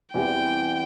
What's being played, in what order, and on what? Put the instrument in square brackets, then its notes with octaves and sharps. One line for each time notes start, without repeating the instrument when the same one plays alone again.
[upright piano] E2 E3 G3 C4 [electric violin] G5